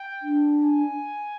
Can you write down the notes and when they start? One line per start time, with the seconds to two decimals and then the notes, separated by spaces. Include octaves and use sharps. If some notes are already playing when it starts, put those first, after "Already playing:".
Already playing: G5
0.22 D4
0.64 G#5